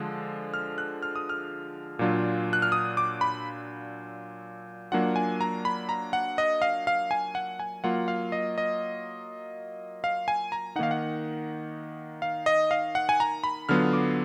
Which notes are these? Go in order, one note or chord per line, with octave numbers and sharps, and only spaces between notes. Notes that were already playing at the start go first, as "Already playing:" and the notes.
Already playing: D3 F3 G#3
F6
F#6
F6
D#6
F6
A#2 F#3 D4 F4
F#6
F6
D#6
D6
B5
F#3 A#3 D4 F4 F#5
G#5
A#5
B5
A#5
F#5
D#5
F5
F5
G#5
F#5
G#5
F#3 A#3 F4 F#5
F5
D#5
D#5
F5
G#5
A#5
D#3 A#3 D#4 F5 F#5
F#5
F5
D#5
F5
F#5
G#5
A#5
B5
D3 F#3 B3 F4 F6
D6